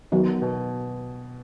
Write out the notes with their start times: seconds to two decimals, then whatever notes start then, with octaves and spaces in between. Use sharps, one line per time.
0.12 D#3 F#3 B3
0.42 B2